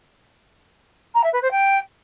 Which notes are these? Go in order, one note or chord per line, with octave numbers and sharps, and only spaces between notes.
A#5
E5
B4
C5
G5